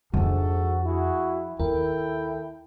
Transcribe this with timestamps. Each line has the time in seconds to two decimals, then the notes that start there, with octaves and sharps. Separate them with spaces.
0.14 F2 G#2 F3 D4 F#4 A4
0.86 E4 F#4 G#4
1.59 D#2 E4 A4 A#4 G5